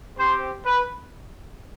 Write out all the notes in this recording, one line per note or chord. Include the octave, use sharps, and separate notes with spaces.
C4 G4 C5
B4